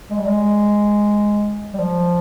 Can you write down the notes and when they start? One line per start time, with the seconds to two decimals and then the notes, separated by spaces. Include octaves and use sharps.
0.10 G#3
0.19 G3
0.26 G#3
1.74 G3
1.79 F3